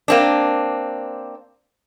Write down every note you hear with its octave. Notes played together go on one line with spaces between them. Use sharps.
A#3 C4 D4